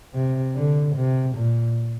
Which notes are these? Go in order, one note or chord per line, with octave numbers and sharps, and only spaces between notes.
C3
D3
C3
A#2